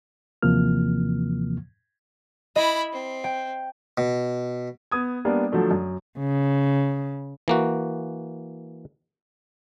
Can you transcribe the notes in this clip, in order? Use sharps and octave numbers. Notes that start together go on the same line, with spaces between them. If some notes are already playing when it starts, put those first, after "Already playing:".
D#2 C3 E3 F3 A#3 F6
E4 D#5 B5
C4
G5
B2
B3 D#6 G#6
G3 A#3 B3 D4
D3 F3 F#3 A3 D4
F#2
C#3
E3 A#3 F#4